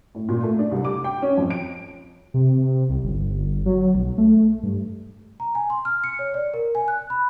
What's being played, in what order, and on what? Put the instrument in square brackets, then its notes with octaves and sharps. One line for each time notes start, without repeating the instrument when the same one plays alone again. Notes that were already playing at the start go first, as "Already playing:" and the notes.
[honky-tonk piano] A2
A#2
A3
D4
C2
D6
G5
C#4
F2
D7
[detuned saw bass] C3
C2
G1
F#3
B1
A3
G2
[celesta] A#5
G#5
C6
F6
C#7
C#5
D5
A#4
G#5
F#6
B5